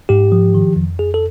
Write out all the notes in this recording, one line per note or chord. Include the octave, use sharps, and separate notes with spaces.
G#2 G4
F3
D#3
F2
F2 G#4
A4